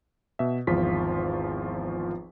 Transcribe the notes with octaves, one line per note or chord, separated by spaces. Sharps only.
B2 E5
G#1 E2 F3 F4 B6